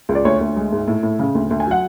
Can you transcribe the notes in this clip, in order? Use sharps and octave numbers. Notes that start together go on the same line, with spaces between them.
C#2
D5
D2 C#5
D2
G#3
G#2
A2
A2
C#3
D2
D2
G#5
F#3 F#5